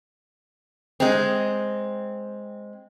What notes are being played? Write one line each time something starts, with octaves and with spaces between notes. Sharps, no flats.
G#3 C4